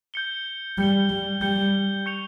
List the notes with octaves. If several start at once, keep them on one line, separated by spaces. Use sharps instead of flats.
G6 C#7 G7
G3 G6 C#7 G7
G3
G3 G6 C#7 G7
C#6 G6 C#7 F7